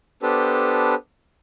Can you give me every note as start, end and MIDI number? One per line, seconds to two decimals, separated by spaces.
0.22 0.95 59
0.22 0.95 62
0.22 0.95 67
0.22 0.95 69
0.22 0.95 71
0.22 0.95 72